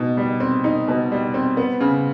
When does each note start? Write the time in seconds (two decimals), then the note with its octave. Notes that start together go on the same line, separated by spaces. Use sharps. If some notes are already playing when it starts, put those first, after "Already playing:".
Already playing: B2 D#4
0.17 G3
0.40 C4
0.64 D#4
0.88 B2
1.12 G3
1.34 C4
1.57 B3
1.80 C#3